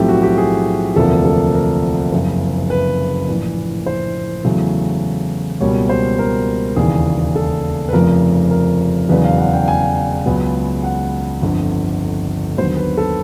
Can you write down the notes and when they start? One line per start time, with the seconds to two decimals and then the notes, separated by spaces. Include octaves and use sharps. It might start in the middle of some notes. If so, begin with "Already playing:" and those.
Already playing: B1 A2 F3 A3 C4 G4
0.08 F#4
0.23 G4
0.38 G#4
0.95 E1 D2 C3 F3 A#3 A4
1.25 A4
1.54 A#4
2.12 F#1 F2 C#3
2.70 B4
3.28 A#1 A2 E3
3.86 C5
4.44 E2 C#3 F#3 A3
5.61 C#2 B2 G3 A#3 C#5
5.89 C5
6.19 A#4
6.76 E1 D#2 C#3 E3 G#4
7.36 A4
7.89 B4
7.93 F1 F2 C#3 F3 A#4
8.51 A#4
9.09 E1 E2 C#3 F#3 B4
9.24 F5
9.38 F#5
9.53 G5
9.68 G#5
10.26 C#2 C#3 F#3 B3
10.84 F#5
11.42 G1 F2 D3
12.58 D#2 D3 F#3 B3 C5
12.77 B4
12.97 A4